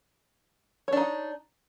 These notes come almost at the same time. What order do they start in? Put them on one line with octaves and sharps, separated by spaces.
C#5 D4 D#4